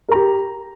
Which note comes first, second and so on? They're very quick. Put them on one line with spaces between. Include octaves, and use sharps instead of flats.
A#4 A#5 G4